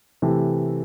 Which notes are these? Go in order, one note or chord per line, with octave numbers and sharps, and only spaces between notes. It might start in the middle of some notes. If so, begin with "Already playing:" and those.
C3 E3 A3